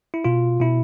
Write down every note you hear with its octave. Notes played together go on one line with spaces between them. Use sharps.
E4
B2 F4
B2 E4